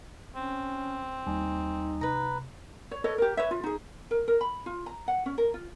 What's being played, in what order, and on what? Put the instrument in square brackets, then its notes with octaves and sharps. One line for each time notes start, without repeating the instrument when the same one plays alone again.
[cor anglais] C4 [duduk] C#4
[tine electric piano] D#2 G3 G#5 [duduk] D#4
[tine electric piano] C3 [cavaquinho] B4 A#5
[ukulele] C#5
A4 B4 C#5 D#5
G4 A#4
B4 C#5 E5
F4
D#4 G#4
A#4
A#4
B5
F4
A#5
F#5
C#4
A#4
F4